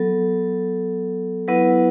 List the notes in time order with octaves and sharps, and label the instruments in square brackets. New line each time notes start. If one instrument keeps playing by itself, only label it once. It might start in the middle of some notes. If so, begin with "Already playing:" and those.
Already playing: [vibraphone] F#3 B3 A4
F#3 B3 E4 B4 F#5